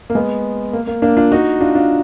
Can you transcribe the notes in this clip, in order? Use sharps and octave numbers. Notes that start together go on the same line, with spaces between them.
A#3
G#3 B3
A#3
A#3
A#3 D4
D4 F4
D#4 F#4
D4 F4
D4 F4